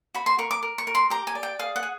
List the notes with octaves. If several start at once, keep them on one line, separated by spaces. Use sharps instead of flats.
F#4 B5
C6
A#4 C#6
D6
A#4
C#6
A#4
C6
G4 A#5
G#5
D5
G5
G#4 F5
F#5
G#4